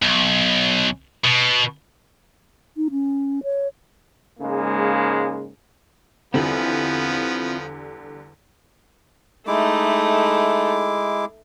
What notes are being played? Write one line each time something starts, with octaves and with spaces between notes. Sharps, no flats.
B1
B2
D#4
C#4
C#5
G#2 C#3 G#3 A#3
E2 D3 F3 G3 B3 C4 E4 F4
G#3 A3 D#4 E4 D6